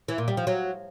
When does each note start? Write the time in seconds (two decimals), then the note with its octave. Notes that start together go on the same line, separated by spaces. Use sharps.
0.08 E3
0.18 A#2
0.28 G3
0.37 F3
0.47 F#3